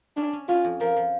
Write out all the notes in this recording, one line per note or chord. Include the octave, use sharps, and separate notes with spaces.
C#4 D4
C#4
C#4 F4
F2
F3 A#4
F3